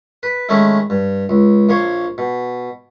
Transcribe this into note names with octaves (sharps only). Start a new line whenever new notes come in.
B4
D#3 G#3 A3 C#4 D#4 E4
G2
C#2
A#1 A#3 C#5 C6
B2